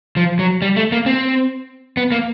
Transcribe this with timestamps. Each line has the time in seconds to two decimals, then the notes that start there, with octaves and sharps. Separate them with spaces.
0.16 F3
0.39 F#3
0.62 G3
0.76 A3
0.92 A#3
1.06 C4
1.97 B3
2.12 A#3